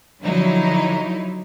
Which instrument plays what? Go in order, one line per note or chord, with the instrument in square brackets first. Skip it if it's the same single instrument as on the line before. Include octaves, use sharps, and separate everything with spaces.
[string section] D3 F3 F#3 D#4 E4